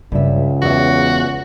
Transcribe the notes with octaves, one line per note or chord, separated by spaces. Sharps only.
C#2 G2 C#3 E5
E2 B3 F#4 E5